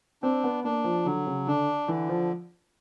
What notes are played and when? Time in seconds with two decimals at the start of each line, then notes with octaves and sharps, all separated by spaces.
0.23 C4 D4
0.44 B3
0.64 A#3 D4
0.84 F3
1.05 D3 F#3
1.27 C#3
1.47 D3 D4
1.88 D3 E3
2.09 F3